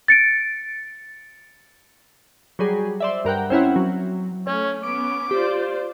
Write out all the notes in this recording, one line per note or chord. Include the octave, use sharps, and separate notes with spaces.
A6 C#7 D7
F#3 G3 G#4
C5 D5 E5
G2 A#4 F#5 G5
C4 C#4 E4 F#5
F#3
A3 C#4 C#5
B3 C#4 D6 D7
F4 G4 C5 D5